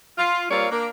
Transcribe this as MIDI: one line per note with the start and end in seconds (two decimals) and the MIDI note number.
0.18 0.45 65
0.51 0.67 55
0.51 0.67 58
0.51 0.67 60
0.51 0.67 65
0.51 0.67 73
0.51 0.67 74
0.71 0.87 58
0.71 0.87 62
0.71 0.87 70